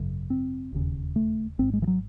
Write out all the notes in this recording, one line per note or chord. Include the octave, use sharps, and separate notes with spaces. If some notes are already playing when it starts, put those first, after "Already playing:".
Already playing: G#1 F#2 C#3
C4
E1 D#2 C#3
A3
G#1 G#2 C4
G#3
E3
F#3